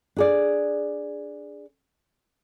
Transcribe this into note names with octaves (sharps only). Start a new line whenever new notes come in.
D4 G#4 D5